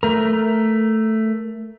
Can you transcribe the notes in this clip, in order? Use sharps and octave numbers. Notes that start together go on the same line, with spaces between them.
A3 A#4